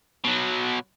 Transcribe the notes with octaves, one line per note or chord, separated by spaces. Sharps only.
B2 F#3